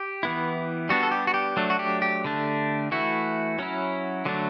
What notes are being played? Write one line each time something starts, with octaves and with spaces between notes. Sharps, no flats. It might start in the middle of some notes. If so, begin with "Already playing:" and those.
Already playing: G4
E3 B3 E4
G3 B3 D4 F#4
A4
G4
F#4
G4
F#3 A3 D4
F#4
G4
G4
D3 A3 D4
E3 A3 E4 F#4
F#3 C#4 E4
D3 F#3 A3 D4